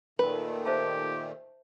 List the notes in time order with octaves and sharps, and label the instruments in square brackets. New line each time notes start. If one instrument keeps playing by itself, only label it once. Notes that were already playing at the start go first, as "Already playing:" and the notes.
[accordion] A#2 D#3 A3 [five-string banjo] B4
[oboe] G4 [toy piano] C5 E5 A5